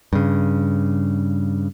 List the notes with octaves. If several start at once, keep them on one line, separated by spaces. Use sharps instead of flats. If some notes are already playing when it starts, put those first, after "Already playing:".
G2 C#3